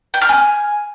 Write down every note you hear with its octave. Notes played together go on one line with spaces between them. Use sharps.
G5
F6
G#5